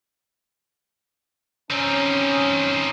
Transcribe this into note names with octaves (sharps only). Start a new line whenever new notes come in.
C4 C#4 D#4